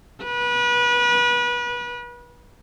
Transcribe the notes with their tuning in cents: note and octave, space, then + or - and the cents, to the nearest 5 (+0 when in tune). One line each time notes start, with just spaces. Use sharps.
B4 -30